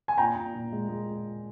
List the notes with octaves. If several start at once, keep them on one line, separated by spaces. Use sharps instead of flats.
G#5
A#2 G5 A#5
A#2
A#2
G#3
G#3